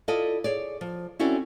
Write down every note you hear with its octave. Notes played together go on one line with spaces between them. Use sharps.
E4 F4 A4 D5 D#5
G#4 C#5 D5
F3
C4 C#4 E4 F#4 A4 D5